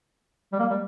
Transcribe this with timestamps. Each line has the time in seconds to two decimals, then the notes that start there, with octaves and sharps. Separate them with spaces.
0.53 G3
0.59 A#3
0.70 G3